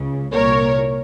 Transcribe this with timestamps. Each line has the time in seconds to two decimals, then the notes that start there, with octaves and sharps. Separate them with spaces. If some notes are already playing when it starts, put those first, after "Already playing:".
Already playing: C#2 C#3
0.33 C2 A#2 A#4 C#5